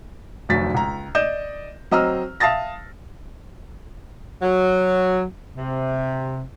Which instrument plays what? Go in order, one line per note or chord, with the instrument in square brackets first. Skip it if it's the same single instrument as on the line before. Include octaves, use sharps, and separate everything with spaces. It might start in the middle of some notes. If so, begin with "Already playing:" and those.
[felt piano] F1 D2 F#3 A6 B6
C#2 A#5
D5 D#5 G6 E7
F#3 C4 D#5 A#5 E6 F6
E5 F5 A5 D#6 A6 A#6
[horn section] F#3
C3